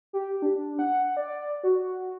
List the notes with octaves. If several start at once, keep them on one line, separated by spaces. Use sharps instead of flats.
G4
D4
F#5
D5
F#4